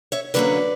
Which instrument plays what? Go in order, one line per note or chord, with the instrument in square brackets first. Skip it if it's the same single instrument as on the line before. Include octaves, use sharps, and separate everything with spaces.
[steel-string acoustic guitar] C#5 E5
D3 F#3 A#3 C#4 B4 D5